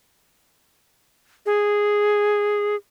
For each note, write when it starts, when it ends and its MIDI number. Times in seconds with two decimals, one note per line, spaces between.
1.46 2.76 68